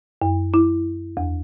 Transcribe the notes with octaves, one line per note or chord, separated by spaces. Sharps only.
F#2
E4
E2